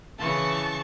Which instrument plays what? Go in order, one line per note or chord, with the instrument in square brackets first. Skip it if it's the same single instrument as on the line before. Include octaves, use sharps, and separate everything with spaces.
[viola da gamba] C#3 E3 [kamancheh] A5 C#6